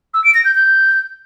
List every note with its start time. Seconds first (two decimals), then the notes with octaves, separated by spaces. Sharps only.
0.14 E6
0.24 D7
0.34 A#6
0.45 G6
0.55 G6